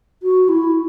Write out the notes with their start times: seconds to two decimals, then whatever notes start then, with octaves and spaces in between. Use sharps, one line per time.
0.23 F#4
0.49 E4